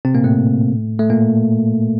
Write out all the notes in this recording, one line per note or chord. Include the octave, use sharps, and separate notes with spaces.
C3 C4
A#2 A#3
A2 A3
A3
A#2 A#3